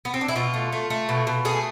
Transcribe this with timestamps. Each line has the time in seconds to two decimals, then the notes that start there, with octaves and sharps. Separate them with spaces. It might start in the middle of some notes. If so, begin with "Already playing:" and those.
0.05 B3
0.14 C4
0.21 D4
0.28 E4
0.36 B2 F4
0.54 A3
0.72 A3
0.90 A3
1.09 B2
1.27 B2
1.45 A3 G#4